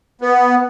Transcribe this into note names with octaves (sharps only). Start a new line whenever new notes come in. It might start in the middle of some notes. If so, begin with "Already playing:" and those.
B3